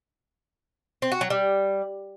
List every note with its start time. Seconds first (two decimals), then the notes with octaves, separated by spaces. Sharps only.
1.02 C4
1.12 F#4
1.21 F#3
1.30 G3